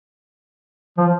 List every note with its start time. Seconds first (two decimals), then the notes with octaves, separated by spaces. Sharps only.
0.98 F3